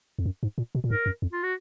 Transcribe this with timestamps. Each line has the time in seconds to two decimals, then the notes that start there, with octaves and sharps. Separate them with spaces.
0.19 F2
0.26 F#2
0.43 G#2
0.58 A#2
0.75 B2
0.84 A#2
0.90 G#2 A#4
1.06 F#2
1.22 F2
1.32 F4
1.43 F#4